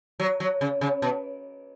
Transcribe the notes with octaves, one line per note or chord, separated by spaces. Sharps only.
F#3
F#3
C#3
C#3
B2